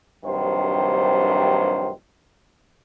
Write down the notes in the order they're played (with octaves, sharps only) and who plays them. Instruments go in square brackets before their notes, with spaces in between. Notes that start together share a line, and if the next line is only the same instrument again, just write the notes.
[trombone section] A#1 G2 C3 D#3 F#3 C5